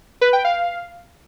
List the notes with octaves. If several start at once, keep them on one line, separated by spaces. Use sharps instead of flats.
B4
G5
F5